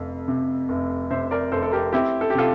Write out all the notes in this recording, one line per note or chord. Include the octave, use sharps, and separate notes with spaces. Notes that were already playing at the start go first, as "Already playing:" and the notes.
Already playing: F1 F2
C3
F1
C3 C5 E5
A#4 D5
F1 A4 C5
A4
G4 A#4
C4 E4 G4
A4
G4
C3 F4 A4